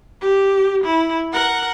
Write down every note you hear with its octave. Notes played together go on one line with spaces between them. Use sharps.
G4
E4
A#4 F#5